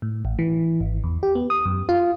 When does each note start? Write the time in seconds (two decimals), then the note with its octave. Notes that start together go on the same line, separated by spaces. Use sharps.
0.02 A2
0.25 A1
0.39 E3
0.81 G#1
1.04 E2
1.23 G4
1.35 B3
1.50 D#6
1.65 F#2
1.89 F4